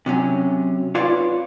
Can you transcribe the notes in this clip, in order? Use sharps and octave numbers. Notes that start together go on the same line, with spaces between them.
C3 F#3 C#4
F4 B4 C#5 D5 F5